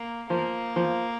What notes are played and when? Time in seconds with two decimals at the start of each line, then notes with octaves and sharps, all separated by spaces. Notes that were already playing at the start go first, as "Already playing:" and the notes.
Already playing: A#3
0.30 F3 A#3
0.76 F3